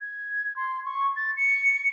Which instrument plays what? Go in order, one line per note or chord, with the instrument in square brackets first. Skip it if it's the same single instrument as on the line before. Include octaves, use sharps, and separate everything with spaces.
[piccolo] G#6
C6
C#6
A6
C#7